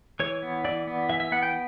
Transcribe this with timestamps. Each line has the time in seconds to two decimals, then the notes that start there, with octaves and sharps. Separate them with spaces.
0.20 E3 C#5
0.42 B3
0.65 E3 D5
0.87 B3
1.09 E3 E5
1.20 E5
1.32 B3 F#5
1.43 G5